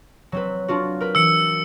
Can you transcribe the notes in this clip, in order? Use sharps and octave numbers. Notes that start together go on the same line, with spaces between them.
F#3 C4 B4
D4 F4 F#4
A#4 B4
E3 E6 C#7